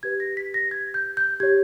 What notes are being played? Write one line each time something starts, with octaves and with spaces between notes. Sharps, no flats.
G4 B4 G#6
A#6
B6
A#6
G#6
G6
G6
G4 C#5 G#6